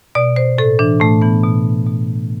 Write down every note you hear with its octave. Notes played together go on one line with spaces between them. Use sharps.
B2 D5
C5
A2 A4
E3 D4
A2 A3
E3 B3
B2
B2